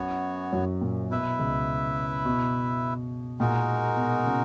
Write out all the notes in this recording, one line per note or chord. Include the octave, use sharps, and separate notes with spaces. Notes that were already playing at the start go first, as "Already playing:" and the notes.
Already playing: F#2 F#3 B3 F#4 C#5
F#2 F#3
A#2
B2 E4 B4 E5
C#2 C#3
B2
A#2 G#3 D#4 F#4 A#4
B2
C#3